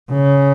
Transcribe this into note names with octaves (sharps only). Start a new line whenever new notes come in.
C#3